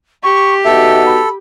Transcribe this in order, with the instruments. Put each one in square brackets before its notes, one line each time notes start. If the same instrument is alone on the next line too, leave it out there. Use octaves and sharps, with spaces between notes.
[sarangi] G4 [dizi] C#6
[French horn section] B3 D#4 F#4 [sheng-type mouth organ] A4 [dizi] E5
[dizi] B5